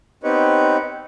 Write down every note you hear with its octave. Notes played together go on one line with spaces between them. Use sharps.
B3 C4 D#4 G4 B4 C#5